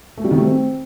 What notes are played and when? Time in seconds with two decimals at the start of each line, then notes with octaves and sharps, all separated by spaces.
0.18 A3
0.24 G3
0.31 D#3
0.38 A3
0.44 C4